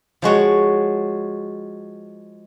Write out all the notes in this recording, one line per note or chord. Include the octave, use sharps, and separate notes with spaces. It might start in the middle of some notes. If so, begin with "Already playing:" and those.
F3 G#3 F#4 C#5